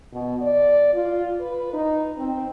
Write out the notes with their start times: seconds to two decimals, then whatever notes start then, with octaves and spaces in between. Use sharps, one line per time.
0.13 B2
0.42 D5
0.94 F4
1.41 B4
1.74 D#4
2.18 C4